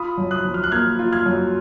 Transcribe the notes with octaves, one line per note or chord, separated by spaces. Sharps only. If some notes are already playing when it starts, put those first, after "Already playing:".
Already playing: F4 B5 D#6
F#2
D#6 F#6
F3
F6
F#6
A#3 F6 G#6
F4
F6 G#6
F#2